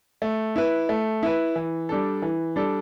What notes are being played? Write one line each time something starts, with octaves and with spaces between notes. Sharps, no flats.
A3
E4 B4
A3
E4 B4
E3
G3 D4 A4
E3
G3 D4 A4